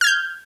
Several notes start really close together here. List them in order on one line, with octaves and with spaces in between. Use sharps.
F6 G#6 G6